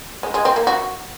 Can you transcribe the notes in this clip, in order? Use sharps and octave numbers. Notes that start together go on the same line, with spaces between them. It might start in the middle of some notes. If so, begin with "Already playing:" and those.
G#3
G#3
C4
A#3
F#4